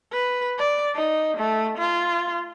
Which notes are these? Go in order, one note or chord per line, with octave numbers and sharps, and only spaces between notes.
B4
D5
D#4
A3
F4